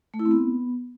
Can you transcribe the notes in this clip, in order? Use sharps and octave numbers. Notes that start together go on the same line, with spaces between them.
A3
E4
C4
B3